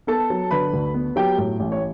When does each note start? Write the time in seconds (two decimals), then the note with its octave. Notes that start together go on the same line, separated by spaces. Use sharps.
0.07 B3 A4 A5
0.30 F#3
0.51 D3 B4 B5
0.73 D2
0.94 B3
1.16 F#3 G4 G5
1.38 A2
1.60 A1
1.72 C#5